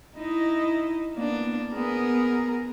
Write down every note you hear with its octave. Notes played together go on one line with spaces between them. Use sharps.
D#4 E4 D#5
A#3 B3 D4
B3 G#4 A#4